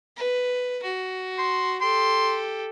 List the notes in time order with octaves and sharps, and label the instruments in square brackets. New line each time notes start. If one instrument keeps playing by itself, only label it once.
[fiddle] B4
F#4
[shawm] C6
[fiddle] G4 A4 [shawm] C6